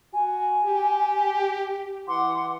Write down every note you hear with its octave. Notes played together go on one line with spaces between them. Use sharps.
F#4 G#5
G4
E3 F#5 C6 D6